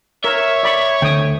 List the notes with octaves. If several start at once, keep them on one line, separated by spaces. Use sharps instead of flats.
A#4 C#5 E5
D5 B5 C#6
D2 G5 D#6